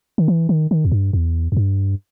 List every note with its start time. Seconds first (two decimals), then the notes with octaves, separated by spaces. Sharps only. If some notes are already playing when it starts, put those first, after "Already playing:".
0.18 D#3
0.28 E3
0.49 D#3
0.71 D#3
0.85 E2
0.92 G2
1.13 E2
1.52 E2
1.57 G2